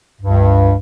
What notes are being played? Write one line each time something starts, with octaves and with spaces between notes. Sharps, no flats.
C#2 G2